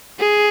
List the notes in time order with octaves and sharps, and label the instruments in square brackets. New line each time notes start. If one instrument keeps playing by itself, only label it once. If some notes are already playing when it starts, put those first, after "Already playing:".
[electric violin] G#4